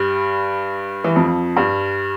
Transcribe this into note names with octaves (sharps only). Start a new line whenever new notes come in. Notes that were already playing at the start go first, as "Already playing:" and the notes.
Already playing: G2 G3
E3
F2 F3
G2 G3